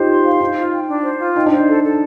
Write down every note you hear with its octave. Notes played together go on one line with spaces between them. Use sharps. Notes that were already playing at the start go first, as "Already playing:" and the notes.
Already playing: D#4 F4 G4 C5
C6
F5
D#4 C5
F4
G5
D4
C5
F4
D#4 G5
D4
D#4 C5
A4
A4